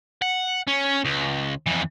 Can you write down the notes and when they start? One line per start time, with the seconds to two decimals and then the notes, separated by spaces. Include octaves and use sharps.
0.22 F#5
0.67 C#4
1.05 C#2
1.67 F2 E3